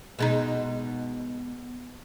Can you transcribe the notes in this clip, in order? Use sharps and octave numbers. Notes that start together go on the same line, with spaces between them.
B2 G#3 D#4